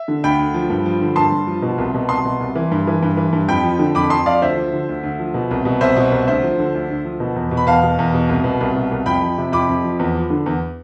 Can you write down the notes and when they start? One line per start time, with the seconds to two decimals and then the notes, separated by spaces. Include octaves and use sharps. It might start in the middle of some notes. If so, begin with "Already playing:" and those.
Already playing: E5
0.08 D3
0.24 D2 G5 B5
0.39 D2
0.54 F3
0.70 G2
0.86 F3
1.02 D3
1.16 G2 A5 C6
1.32 G2
1.47 F3
1.62 B2
1.78 C2
1.94 B2
2.09 C2 A5 C6
2.25 B2
2.40 C2
2.55 E3
2.71 G2
2.87 E3
3.02 G2
3.17 E3
3.33 G2
3.48 F2 G5 B5
3.64 F3
3.79 D3
3.95 F2 B5 D6
4.10 F2 A5 C6
4.26 F3 D5 F5
4.41 D2 C5 E5
4.57 F3
4.73 D3
4.89 D2
5.03 D2
5.19 F3
5.34 B2
5.51 C2
5.65 B2
5.81 C2 C5 E5
5.97 B2
6.12 C2
6.27 D2 C5 E5
6.44 F3
6.59 D3
6.75 D2
6.90 D2
7.05 F3
7.20 B2
7.36 E2
7.51 B2
7.57 B5
7.66 E2 F5 A5
7.83 B2
7.99 E2
8.13 B2
8.29 C2
8.44 B2
8.61 C2
8.76 B2
8.91 C2
9.06 F2 G5 B5
9.22 F3
9.38 C3
9.52 F2 B5 D6
9.69 F2
9.84 F3
9.99 E2
10.15 F3
10.30 D3
10.46 E2